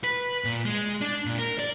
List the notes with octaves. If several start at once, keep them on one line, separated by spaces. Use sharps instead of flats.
B4
A#2
G#3
D4
A#2
A#4
D5